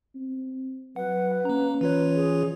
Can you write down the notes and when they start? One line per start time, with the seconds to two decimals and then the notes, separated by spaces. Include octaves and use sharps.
0.15 C4
0.96 F#3 B4 F#5
1.45 A#3 C#4 A#5
1.81 E3 F4 B4 C#5
2.16 G#4